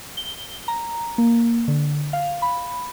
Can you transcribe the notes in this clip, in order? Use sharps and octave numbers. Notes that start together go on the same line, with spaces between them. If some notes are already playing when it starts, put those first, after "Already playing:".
G7
A#5
A#3
D3
F5
B5